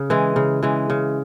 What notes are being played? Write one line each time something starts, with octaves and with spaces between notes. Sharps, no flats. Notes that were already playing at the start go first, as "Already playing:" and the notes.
Already playing: C#3
E3 G#3
C#3
E3 G#3
C#3